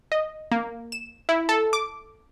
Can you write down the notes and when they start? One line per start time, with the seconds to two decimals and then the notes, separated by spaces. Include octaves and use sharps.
0.12 D#5
0.52 A#3
0.92 E7
1.29 E4
1.49 A4
1.73 D6